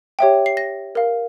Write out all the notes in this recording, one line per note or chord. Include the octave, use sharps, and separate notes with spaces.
G4 C#5 E5 G5
C7
A#6
A#4 F5